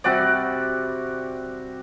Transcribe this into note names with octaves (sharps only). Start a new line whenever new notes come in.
C3 G3 F#4 D5